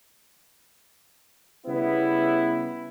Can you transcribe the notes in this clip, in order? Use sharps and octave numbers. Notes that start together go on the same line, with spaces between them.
C#3 G3 B3 E4